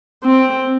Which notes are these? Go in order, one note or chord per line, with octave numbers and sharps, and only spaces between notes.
C4